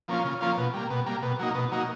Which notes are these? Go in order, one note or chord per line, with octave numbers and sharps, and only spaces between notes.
F3 A#3 C#4 F4
C#3
F3 A#3 C#4 F4
B2
G3 A#3
B2
G3 A#3
B2
F#3 A#3 D#4
B2
F#3 A#3 D#4